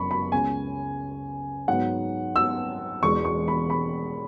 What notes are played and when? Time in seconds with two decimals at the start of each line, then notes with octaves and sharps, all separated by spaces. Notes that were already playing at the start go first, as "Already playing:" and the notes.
Already playing: F#1 B5 C#6
0.11 B5
0.32 C#2 C#3 G#3 B3 G#5
1.68 G#2 F#3 B3 F#5
2.36 E6
3.03 E1 E2 B2 G#3 C#6
3.25 C#6
3.48 B5
3.70 B5